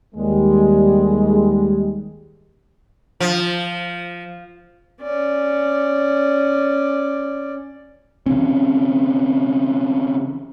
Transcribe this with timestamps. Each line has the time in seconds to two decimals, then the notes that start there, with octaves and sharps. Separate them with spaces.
0.15 D#2 G3 G#3
3.20 F3
5.02 C#4 D5
8.26 C#3 E3 C4 C#4